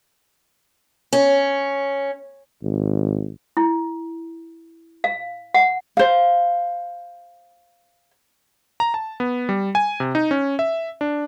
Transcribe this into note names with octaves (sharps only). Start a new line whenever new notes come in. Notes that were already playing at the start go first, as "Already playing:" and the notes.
C#4
G#1
E4
F5
F#5
C5 F5
A#5
A5
B3
G3
G#5
C3
D#4
C#4
E5
D4